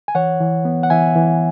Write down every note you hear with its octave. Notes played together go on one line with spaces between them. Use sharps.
G#5
E3 C#5 F#5
E3
B3
F#5
E3 E5 G#5
E3